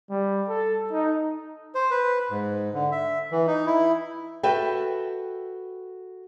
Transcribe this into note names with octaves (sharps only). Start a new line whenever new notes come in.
G3
A4
D#4
C5
B4
G#2
D3
E5
E3
D#4
E4
F#4 A4 B4 E5 G5